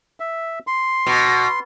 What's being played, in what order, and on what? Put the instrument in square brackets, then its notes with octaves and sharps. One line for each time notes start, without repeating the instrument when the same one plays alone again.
[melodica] E5
C6
[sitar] B2